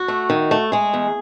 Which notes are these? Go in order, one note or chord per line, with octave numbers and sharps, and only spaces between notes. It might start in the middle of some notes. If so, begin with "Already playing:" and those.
Already playing: F#4
A3
D#3
A3
G#3 G#4
E2